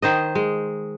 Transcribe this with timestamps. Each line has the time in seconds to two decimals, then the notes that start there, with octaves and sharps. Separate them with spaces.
0.02 D#3 C5 D#5
0.35 G#3